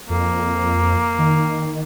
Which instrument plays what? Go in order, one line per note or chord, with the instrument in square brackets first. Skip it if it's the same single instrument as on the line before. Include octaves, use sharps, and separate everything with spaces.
[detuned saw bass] F2 [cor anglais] A#3
[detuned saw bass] D#3